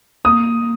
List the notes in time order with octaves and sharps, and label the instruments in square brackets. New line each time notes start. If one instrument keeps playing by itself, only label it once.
[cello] A#3 [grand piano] D#6